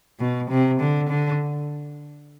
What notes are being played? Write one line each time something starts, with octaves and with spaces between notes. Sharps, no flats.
B2
C3
D3
D3